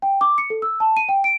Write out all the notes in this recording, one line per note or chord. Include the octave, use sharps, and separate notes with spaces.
G5
D6
C#7
A4
E6
A5
D#7
G5
D7